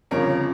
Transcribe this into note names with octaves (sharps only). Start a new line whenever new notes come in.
G1 F2 C#3 F3 A#4 C#5